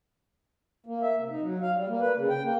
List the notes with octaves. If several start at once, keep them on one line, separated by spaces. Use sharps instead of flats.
A#3
E5
C3
D#4
F#3
F5
G3
A#3
B4
C#3
G5
A#3